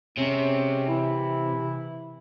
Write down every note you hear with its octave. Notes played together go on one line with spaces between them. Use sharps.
C3 G#3 C4 C#4
E3 E4